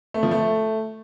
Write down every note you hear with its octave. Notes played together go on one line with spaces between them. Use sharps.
A3
F3
A3